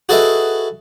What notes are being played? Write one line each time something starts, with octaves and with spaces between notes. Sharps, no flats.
F#4 G#4 A4 B4 D#5 E5